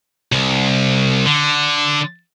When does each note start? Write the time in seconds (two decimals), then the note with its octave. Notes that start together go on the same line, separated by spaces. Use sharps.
0.32 C2
1.26 D3